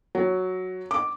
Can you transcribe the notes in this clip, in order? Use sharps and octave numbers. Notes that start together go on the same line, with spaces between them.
F#3
D6